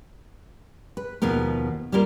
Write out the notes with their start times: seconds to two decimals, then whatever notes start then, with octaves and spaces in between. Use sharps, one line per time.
0.97 B4
1.22 D#2 B2 F3 B3 A#4
1.92 G3 A#3 F4 A#4